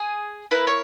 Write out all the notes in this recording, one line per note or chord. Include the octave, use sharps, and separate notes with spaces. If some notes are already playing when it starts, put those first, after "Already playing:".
Already playing: G#4 G#5
A#3 C#4 E4 B4 B5
C#5 C#6